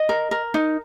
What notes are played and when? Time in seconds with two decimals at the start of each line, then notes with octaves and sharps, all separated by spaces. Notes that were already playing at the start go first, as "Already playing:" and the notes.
Already playing: D#5
0.09 A#4
0.31 A#4
0.54 D#4